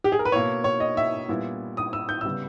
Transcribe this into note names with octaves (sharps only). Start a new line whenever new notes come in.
G4
G#4
A#4
B4
B2 A#3 E4 C#5
C#5
D#5
E5
A#2 G3 B3 E4
D#6
E6
G6
C#3 G3 B3 E6